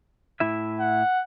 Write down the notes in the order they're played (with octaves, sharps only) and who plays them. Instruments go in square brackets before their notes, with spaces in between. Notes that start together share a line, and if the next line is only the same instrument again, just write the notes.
[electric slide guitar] A2 E4 E5
[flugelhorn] F#5